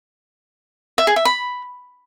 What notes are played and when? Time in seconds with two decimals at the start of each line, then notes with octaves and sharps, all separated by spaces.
0.98 E5
1.07 G#4
1.16 E5
1.25 B5